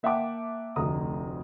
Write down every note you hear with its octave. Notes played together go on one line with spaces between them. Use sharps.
A#3 E5 F#5 G5 A5 D6
F1 D2 A#5 D#6